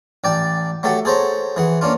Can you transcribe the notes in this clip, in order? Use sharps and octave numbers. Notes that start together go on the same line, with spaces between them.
A1 D5 G5 A5
F#3 A3 G4 A4 F#5
G#4 A4 C5 C#5 A#5
E3 G#4 F#5
A#3 C#4 D4 F4